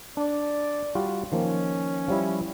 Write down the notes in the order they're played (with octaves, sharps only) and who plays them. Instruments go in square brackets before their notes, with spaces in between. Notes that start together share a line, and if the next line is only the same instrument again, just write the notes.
[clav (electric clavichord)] D4 [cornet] D5
[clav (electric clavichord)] G3 F4 F#4
[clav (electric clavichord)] D#3 F3 A#3 [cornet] C#4
[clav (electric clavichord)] F3 G3 E4